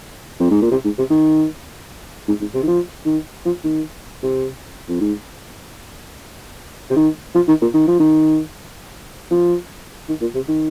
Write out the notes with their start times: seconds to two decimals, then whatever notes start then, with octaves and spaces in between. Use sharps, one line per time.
0.40 F2
0.51 G#2
0.62 A#2
0.71 C3
0.85 G#2
0.98 C3
1.10 D#3
2.28 G#2
2.41 G#2
2.54 C3
2.63 D#3
2.68 F3
3.06 D#3
3.45 F3
3.64 D#3
4.23 C3
4.88 F2
5.01 G#2
6.90 C3
6.96 D#3
7.35 F3
7.48 D#3
7.62 A#2
7.74 D#3
7.88 F3
8.00 D#3
9.31 F3
10.09 D#3
10.21 A#2
10.35 C3
10.48 D#3